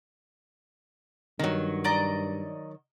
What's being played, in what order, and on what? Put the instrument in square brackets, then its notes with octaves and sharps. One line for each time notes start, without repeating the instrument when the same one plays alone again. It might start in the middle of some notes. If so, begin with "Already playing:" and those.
[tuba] G2 [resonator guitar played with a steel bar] D#3 F#3
[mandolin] D5 D#5 A#5